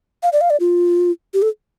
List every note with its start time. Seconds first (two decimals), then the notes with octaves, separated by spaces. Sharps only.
0.23 F5
0.33 D5
0.41 F5
0.50 D5
0.60 F4
1.34 G4
1.42 A4